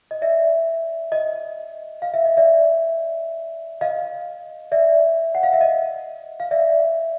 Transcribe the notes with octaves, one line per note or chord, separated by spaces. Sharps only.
D#5
D5 E5
D#5
F5
E5
D#5
D5 E5
D#5 F5
D5 E5
F#5
F5
E5
D#5
F5
D5 E5